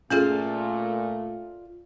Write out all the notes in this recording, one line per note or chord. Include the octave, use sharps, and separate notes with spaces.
A#2 A3 C#4 F4 G#4 A4 D5 F5